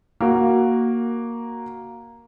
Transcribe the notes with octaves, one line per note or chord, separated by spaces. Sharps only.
A#3 F#4